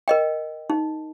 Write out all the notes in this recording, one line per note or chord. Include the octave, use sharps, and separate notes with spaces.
A#4 D#5 G5
D#4